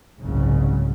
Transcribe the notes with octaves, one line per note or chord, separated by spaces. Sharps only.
F#1 C2 G#2 C#3 F#3